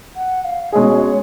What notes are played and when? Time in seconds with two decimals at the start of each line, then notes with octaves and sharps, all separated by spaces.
0.16 F#5
0.45 F5
0.72 B2 G#3 C#4 G#4 D#5
0.95 C#5